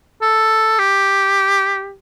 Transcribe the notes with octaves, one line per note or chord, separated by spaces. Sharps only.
A4
G4